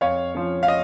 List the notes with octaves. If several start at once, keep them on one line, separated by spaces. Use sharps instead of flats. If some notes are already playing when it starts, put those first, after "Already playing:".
F2 C#5 F5
F3 C#4
F5
D#5